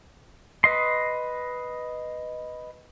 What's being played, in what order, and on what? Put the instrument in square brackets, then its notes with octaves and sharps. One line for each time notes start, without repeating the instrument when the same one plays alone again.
[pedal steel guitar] B4 D#5 C6